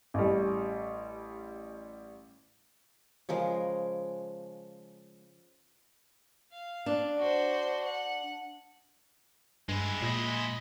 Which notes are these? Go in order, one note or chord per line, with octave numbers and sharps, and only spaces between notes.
A1 G3
C#3 F3 G#3 A#4
F5
D4
F#4 C5
F#5
G2 G#3 E4
A#2 D#5 B5